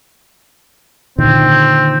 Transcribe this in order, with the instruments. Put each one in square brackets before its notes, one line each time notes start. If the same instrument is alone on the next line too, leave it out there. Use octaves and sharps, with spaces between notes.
[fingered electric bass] A#2 D3 D#3 [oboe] C4